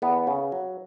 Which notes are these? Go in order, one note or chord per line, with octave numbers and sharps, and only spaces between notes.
E2 B3
C#3
F#3